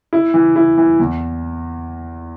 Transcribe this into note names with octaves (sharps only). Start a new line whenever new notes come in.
E4
E3
E4
E3
E2